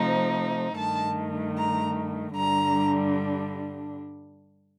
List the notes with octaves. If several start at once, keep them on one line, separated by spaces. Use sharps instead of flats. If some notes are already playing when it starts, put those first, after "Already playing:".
Already playing: C3 F3 A3 D#4
G2 D#3 A3 A5
A#5
G2 D3 G3 D4 A#5